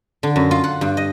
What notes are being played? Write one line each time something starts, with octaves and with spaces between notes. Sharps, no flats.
D3
F#2
F4
F#5
G2
D#5